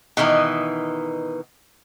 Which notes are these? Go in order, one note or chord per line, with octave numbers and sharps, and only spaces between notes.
B2 D#3 E3 D#4